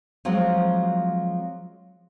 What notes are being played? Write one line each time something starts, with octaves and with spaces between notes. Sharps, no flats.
F3 F#3 G#3 C4 F#4